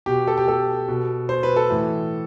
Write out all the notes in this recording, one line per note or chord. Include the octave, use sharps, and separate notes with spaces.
B2 G4
A4
G4
A4
B2
C5
B4
A4
A2 E3